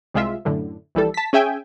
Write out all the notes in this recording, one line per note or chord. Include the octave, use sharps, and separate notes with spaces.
C2 C3 G#3 F4 E5
F#2 A2 D3
A#1 E3 G3 A4
A5 B6
C#4 G#4 E5 G5 G#5